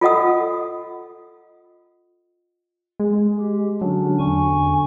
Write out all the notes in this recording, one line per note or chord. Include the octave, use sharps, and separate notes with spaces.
F4 A4 D#5 F#5 D#6
G#3
G4
D3 F#3 C#4 D4
E2 D3 G#5 C#6